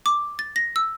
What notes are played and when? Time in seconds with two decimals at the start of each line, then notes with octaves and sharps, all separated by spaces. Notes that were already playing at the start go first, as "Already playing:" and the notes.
0.06 D6
0.39 A6
0.56 A#6
0.76 E6